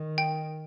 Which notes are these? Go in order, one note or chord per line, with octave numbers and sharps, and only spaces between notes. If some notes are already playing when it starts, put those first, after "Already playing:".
Already playing: D#3
G5